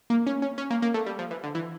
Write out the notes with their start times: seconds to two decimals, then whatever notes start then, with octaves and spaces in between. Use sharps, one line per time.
0.10 A#3
0.27 C#4
0.42 C#4
0.58 C#4
0.70 A#3
0.82 A#3
0.94 A3
1.06 G3
1.19 F3
1.31 E3
1.44 D3
1.55 E3